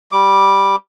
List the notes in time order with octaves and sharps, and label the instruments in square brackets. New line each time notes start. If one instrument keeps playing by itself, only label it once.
[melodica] G3 D6